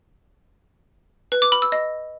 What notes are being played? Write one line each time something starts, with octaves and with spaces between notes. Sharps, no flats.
B4
D6
B5
E6
D#5